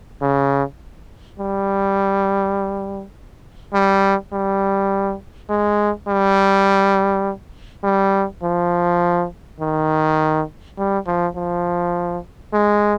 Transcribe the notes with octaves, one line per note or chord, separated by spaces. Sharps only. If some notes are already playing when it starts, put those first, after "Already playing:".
C#3
G3
G3
G3
G#3
G3
G3
F3
D#3
G3
F3
F3
G#3